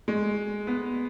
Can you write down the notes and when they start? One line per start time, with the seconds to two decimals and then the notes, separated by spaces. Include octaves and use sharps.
0.08 G#3
0.67 B3